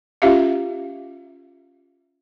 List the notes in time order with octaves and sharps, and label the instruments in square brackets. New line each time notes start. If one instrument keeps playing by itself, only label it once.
[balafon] C#4 F4 G4 E5 F5